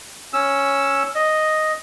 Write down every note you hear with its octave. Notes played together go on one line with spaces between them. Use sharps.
C#4 E6
D#5